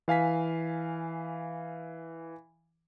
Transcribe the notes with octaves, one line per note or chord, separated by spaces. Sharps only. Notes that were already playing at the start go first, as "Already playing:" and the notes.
E3 F5 G#5 B6